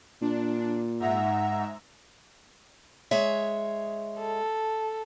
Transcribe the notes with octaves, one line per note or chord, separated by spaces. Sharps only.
A#2 D4
G#2 E5 F#5 A#5
G#3 C#5 E5
A4